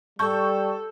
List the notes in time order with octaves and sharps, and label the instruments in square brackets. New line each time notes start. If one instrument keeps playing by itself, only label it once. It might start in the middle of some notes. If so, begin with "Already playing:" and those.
[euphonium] G3 [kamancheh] A4 [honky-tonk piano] A5 C#6 G6